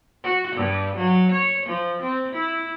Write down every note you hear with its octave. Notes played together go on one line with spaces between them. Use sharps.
F#4
G2
F#3
C#5
F3
C4
E4